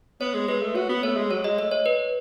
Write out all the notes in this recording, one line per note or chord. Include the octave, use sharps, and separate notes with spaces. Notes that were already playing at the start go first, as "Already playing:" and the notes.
B3 C#5
G#3
G#3 B4
A3
F#4 C#5
B3
A3 C#5
G#3
F#3 C#5
G#3 D#5
A3 D#5
C#5
B4